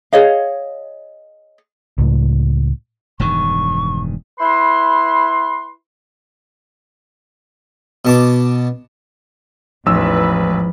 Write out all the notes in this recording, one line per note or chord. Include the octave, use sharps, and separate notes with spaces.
G#4 C#5 D#5 F5
C#2 A2
E1 G2 D#3 C#6
E4 B4 C6
B2 A5 D6
A1 E2 G#2 F3 D#4 B4 E6